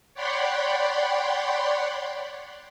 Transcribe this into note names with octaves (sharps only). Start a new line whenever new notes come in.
C#5 D5 F#5 G5 B5 C6